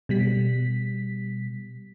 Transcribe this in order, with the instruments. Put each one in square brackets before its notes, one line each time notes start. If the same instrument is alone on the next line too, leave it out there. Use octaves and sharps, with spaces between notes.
[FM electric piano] B2 G3 B6